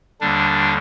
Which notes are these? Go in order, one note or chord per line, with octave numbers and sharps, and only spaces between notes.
D#2 D3 G3 D4